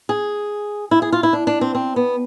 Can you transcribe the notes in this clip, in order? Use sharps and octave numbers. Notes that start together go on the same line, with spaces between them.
G#4
E4
G#4
F4
E4
D4
D4
C4
C4
B3